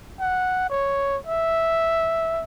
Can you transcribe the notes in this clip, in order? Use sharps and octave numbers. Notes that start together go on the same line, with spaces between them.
F#5
C#5
E5